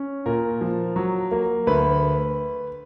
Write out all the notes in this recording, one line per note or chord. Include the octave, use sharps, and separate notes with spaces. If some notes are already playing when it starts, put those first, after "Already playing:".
Already playing: C#4
A#2 A#4
F3
F#3
A#3
D2 B4